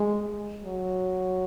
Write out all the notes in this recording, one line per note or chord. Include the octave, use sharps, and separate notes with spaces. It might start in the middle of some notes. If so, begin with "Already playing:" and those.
Already playing: G#3
F#3